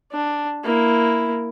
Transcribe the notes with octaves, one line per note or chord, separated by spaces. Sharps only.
D4
A#3 E4